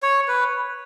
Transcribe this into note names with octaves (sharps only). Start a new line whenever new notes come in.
C#5
B4